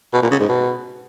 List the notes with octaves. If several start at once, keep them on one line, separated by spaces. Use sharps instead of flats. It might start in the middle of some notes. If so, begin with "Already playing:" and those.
B2
A#2
C#3
G#2
B2